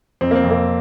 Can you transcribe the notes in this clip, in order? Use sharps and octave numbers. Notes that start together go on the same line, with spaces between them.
F2 C4
A#3
C4
F2
A#3